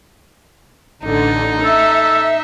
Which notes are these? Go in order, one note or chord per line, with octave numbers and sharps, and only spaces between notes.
A1 D3 D#4
A4 E5